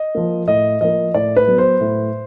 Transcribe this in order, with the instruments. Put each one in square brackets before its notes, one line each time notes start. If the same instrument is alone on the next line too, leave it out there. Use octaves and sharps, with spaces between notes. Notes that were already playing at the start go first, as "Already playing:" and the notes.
Already playing: [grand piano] D#5
F3 A#3
A2 D#5
F3 A#3 D#5
A2 D5
B4
F#3 B3
C5
A2